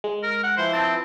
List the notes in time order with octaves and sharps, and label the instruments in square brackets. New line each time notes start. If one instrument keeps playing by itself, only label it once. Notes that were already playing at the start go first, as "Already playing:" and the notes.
[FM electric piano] G#3
[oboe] A#4
F#5
[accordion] E3 F3 E4 [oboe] C5
[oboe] C4 [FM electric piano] A5